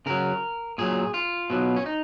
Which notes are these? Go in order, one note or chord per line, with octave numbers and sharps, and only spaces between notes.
C#3 F#3 A#4
A#2 F#3 G#4
F4
B2 F#3
C#4
D#4